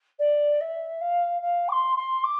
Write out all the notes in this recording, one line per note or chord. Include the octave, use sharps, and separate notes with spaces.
D5
E5
F5
F5
D6
C6
C6
D6